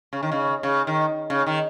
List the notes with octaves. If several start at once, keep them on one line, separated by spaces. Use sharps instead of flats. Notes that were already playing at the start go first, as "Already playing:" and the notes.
C#3
D#3
C#3
C#3
D#3
C#3
D#3